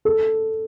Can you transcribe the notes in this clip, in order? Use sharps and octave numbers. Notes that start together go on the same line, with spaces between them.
A4